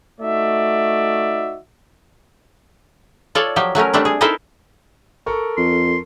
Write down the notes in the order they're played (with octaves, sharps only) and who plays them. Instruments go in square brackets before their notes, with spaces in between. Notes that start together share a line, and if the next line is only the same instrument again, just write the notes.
[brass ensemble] A3 D#4 F#4 D5 E5
[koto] F4 A4 C#5 D5
F3 F#3 G4
F#3 A3 C#4 A#4
G3 A3 C4 D4
G#4
D#4 E4 A4 A#4 C5 E5
[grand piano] A4 A#4 C#6
[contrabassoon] F2 [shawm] C6